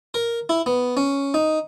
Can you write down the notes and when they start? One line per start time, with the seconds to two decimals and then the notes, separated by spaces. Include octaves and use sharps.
0.14 A#4
0.49 E4
0.66 B3
0.97 C#4
1.34 D#4